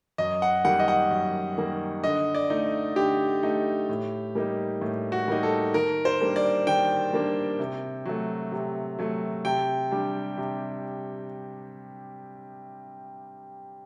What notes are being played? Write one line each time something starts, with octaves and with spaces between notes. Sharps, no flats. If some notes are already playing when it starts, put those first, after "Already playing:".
F#2 D#5
F#5
D#3 G3 A#3 F#5
D#5
F#5
F#2
D#3 G3 A#3
D3 D#5
D5
A3 D#4
D3 G4
A3 D#4
A2
G3 A#3 D#4
A2
F#4
G3 A#3 D#4
A4
D#3 A#4
C5
G3 A#3 D4
D5
D#3 G5
G3 A#3 D4
C3
F#3 A3
C3
F#3 A3
C3 G5
G3 D4
C3